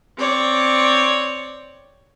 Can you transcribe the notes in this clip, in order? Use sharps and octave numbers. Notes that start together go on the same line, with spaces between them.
C4 C#5 D5